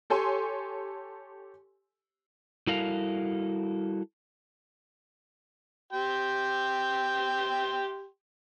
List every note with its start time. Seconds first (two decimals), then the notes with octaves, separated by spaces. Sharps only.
0.10 G4 A4 C#5 G#5 C6
2.67 G3 E4 F#4 A4 A#4 F5
5.93 G4 G5 C6